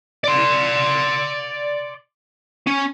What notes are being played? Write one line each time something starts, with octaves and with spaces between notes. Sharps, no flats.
D5 C6
C#4